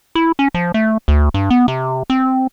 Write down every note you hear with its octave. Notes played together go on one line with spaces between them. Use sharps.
E4
C#4
F3
A3
D2
G2
B3
C3
C4